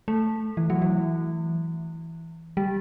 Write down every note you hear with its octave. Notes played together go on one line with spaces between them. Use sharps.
A3
E3
F#3
E3
G3